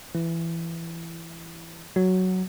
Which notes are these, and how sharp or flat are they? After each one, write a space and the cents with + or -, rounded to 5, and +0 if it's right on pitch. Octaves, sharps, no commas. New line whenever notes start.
E3 +15
F#3 +5